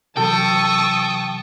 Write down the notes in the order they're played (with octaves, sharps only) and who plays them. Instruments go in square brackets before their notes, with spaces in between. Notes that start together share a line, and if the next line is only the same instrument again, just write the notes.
[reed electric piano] C3 E3 F#3 [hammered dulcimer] A4 [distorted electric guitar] G5 [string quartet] A5 C#6 D#6